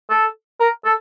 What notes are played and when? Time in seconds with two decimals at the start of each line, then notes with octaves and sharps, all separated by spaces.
0.10 A4
0.60 A#4
0.85 A4